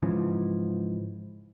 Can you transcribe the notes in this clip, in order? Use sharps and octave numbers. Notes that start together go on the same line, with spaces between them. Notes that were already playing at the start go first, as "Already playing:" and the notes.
G#2 C#3 E3 F3